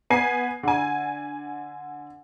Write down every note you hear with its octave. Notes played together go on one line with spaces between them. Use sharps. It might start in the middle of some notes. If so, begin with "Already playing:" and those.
B3 G#5 C7
D3 G#5